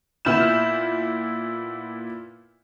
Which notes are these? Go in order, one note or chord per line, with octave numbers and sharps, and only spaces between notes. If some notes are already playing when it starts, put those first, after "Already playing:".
A#2 B3 E4 F6 G6 E7